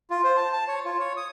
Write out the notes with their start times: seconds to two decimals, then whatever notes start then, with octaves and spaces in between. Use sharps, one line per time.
0.10 F4
0.24 C5
0.37 A5
0.53 A5
0.68 C#5
0.85 F4
0.99 C#5
1.17 D#6